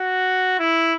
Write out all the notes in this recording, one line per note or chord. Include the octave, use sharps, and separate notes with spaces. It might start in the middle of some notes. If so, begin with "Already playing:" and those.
Already playing: F#4
E4